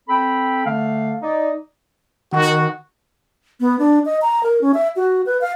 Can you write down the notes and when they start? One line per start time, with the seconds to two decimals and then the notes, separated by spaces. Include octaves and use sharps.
0.09 C4 A4 G5 B5
0.66 D3 A3 F5
1.22 D#4 D5
2.33 D#3 F#4
3.60 B3
3.79 D4
4.05 D#5
4.22 A#5
4.43 A#4
4.61 C#4
4.74 E5
4.96 F#4
5.26 B4
5.41 F5